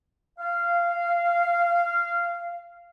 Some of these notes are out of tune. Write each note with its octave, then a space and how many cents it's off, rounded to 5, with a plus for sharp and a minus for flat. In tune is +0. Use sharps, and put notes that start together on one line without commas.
F5 -15